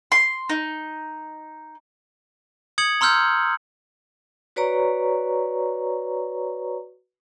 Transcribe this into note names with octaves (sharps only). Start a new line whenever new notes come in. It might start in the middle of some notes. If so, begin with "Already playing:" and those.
C6
D#4
D#6 G#6 C#7 F#7
A#5 C6 E6 F6 G6
F#4 B4 C#5 D5 A#5 C#6